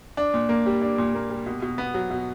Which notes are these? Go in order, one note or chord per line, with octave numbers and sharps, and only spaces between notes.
D4
A#2
A#3
G3
D4
A#2
A#3
G3
B2
B2
B3
F#3
B2